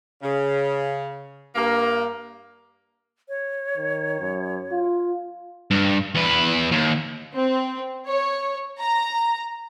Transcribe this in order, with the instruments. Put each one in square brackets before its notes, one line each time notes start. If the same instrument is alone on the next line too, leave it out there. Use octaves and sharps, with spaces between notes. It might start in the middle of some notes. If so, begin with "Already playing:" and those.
[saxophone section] C#3
G2 A#3
[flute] C#5
[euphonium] D#3
F#2
F4
[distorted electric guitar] G2
E2 B4
D#2
[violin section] C4
C#5
A#5